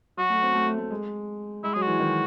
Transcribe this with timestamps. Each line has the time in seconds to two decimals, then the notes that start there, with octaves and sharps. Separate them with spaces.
0.17 F#3 F#4
0.30 A3
0.42 C4
0.54 A3
0.67 A3
0.78 A3
0.91 G#3
1.63 G#3 E4
1.74 F#3 G#4
1.82 F#4
1.87 E3
2.00 D#3